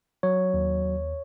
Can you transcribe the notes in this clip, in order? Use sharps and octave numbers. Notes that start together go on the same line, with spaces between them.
F#3 C#5
D#2
D#2